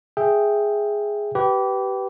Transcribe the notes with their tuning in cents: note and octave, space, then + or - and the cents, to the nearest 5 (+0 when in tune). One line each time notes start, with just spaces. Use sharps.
G#4 +0 E5 +0 G5 +0
G4 -25 B4 +0